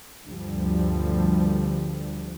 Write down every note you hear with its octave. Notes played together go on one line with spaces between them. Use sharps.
D2 G2 D3 F3 G3